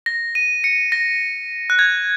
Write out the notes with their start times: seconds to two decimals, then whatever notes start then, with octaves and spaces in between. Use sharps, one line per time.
0.06 A#6
0.35 D#7
0.64 C#7
0.92 A#6
1.70 F#6
1.79 G#6